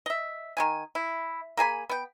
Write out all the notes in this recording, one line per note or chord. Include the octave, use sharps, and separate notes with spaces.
D#5 E5
D#3 E4 G#5
E4
A#3 G#4 G#5 B5
B3 G5